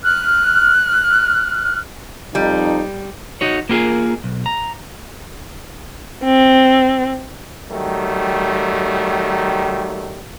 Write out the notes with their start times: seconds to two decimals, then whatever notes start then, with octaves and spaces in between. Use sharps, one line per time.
0.04 F6 F#6
2.35 F2 G3 D#4
3.41 D#4 F#4 C#5
3.69 A#3 B3 F4 G4 G#4 A#4
4.24 B1
4.46 A#5
6.24 C4
7.71 D#3 F#3 G3 A3